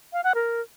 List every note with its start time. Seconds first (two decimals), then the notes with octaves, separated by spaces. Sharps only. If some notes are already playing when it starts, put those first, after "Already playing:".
0.13 F5
0.24 F#5
0.35 A#4